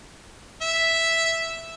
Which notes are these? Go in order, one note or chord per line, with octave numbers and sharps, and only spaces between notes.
E5